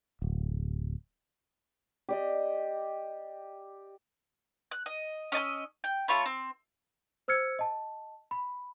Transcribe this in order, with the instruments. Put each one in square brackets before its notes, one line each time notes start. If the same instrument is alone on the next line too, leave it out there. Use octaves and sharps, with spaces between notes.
[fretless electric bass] D1
[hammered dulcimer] G4 D5 D#5
[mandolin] F#6
D#5
C#4 D#5 A5 E6
G5
A3 F4 C#5 B5
C4
[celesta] C5 E6 F6 G#6 C#7
D#5 A5
B5